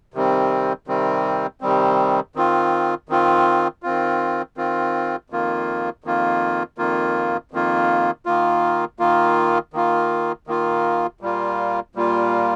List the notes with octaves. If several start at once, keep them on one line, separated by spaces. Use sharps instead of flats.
C3 D#3 G3 C4
C3 D#3 G3 C4
C3 D#3 G3 C4
D#3 C4 F4
D#3 C4 F4
D#3 C4 F4
D#3 C4 F4
F2 D#3 A#3 F4
F2 D#3 A#3 F4
F2 D#3 A#3 F4
F2 D#3 A#3 F4
D#3 A#3 F4
D#3 A#3 F4
D#3 A#3 F4
D#3 A#3 F4
A#2 G3 A#3 F4
A#2 G3 A#3 F4